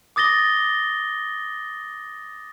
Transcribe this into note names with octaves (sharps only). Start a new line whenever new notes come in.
D6 D#6 A6 A#6 G7